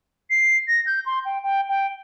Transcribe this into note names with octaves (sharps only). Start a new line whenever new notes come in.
C7
A#6
G6
C6
G5
G5
G5